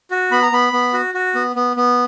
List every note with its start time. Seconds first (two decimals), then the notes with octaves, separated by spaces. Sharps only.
0.11 F#4
0.31 B3 B5
0.43 A#5
0.52 B3 B5
0.73 B3
0.93 F#4
1.14 F#4
1.35 B3
1.56 B3
1.76 B3